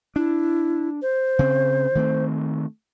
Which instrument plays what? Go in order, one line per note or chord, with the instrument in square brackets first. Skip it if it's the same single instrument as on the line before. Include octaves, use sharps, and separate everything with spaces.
[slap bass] D4 [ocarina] E4
[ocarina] C5
[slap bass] C#3 C4
D#3 A3 C4